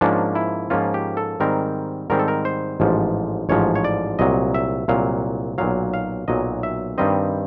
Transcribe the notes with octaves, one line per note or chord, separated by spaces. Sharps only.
G#2 F3 A#3 C#4 D4
E4
G#2 F3 A#3 C#4 F4
G4
A4
G#2 D#3 G3 C4 A#4
G#2 D#3 G3 C4 A#4
A4
A#4
C5
A1 G#2 F3
A1 G#2 F3 C#5
C#5
D5
C2 A#2 F#3 D#5
E5
C2 A#2 F#3 F5
B1 A#2 F#3 F5
F5
B1 A#2 F#3 D#5
E5
G2 D#3 G3 C4 D#5